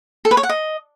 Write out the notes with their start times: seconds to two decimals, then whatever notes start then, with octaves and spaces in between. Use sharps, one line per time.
0.25 A4
0.31 B4
0.37 C#5
0.43 F#5
0.49 D#5